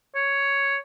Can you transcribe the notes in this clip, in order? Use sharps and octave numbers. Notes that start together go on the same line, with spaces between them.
C#5